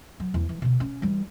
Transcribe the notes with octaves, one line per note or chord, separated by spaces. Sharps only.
F#3
E2
E3
B2 D3
C#4
E3 G3